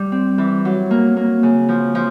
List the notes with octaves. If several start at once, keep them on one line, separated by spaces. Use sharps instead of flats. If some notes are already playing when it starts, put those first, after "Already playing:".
Already playing: G3
C4
E3
F#3
A#3
A#3
C#3
F3
F3